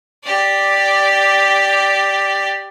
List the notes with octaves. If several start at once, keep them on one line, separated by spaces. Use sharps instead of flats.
G4 D5